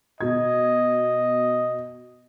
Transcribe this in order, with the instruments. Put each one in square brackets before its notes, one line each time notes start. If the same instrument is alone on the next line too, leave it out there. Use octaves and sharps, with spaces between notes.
[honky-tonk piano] B2 G#6 [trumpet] D#5